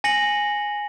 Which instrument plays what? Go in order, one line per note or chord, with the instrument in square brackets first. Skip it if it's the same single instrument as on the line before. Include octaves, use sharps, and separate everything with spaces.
[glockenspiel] G#5 A#6 C#7 F#7